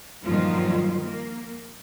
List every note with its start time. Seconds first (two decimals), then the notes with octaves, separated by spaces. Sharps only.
0.23 G2 A#2 D#3 F3 F#3 F4
1.04 A#3